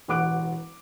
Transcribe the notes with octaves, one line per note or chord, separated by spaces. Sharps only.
E1 A1 F#5 D6 F#6 D7